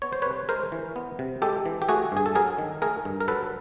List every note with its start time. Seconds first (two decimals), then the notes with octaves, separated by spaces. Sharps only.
0.02 B3 C#5
0.13 C5
0.22 B4 C#5
0.26 C3
0.49 G#3 A#4 C5
0.72 E3
0.96 B3
1.19 C3
1.42 G#3 G4 A4
1.66 E3
1.82 G4
1.89 A3 F#4 G#4
2.12 G2 G#4
2.26 A4
2.35 F#3 G#4 A#4
2.58 D#3
2.82 A3 G#4 A#4
3.05 G2
3.20 A#4
3.28 F#3 A4 B4